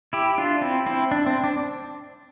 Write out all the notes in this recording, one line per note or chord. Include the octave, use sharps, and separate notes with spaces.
E4 G4
D4 F4
C4 E4
C4 E4
D4
C4
D4